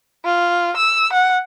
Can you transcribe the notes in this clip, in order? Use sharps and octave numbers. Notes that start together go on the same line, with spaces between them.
F4
E6
F#5